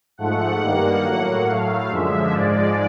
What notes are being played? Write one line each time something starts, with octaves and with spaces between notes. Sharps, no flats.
G#2 F3 A3 F#5
G2 D#3 G3 A#3 F#5
A2 F#3 A#3
A2 F#3 A3 F5
F#2 D3 F3 G#3 E5
G#2 F3 G#3 D5